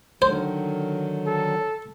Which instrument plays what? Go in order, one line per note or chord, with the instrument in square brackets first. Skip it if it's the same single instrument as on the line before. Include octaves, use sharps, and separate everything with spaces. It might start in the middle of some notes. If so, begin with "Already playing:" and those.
[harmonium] D3 D#3 F#3 [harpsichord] C5
[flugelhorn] A4